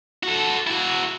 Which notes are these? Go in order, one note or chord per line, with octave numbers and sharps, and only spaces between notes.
F#4 A4
E4 F#4